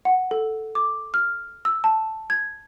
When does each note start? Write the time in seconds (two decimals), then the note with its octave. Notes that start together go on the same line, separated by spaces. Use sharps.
0.05 F#5
0.31 A4
0.75 D6
1.14 F6
1.65 E6
1.84 A5
2.30 G#6